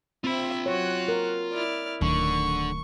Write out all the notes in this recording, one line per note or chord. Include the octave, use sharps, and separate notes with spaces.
C4 F4 E5 B5
F#3 F#4 C#5 F#6
A#4
E4 D5 F6
D1 D3 D#3 C#6